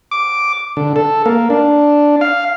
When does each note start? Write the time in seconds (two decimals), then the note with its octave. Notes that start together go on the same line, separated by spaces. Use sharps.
0.11 D6
0.77 D3
0.96 A4
1.26 A#3
1.50 D4
2.21 F5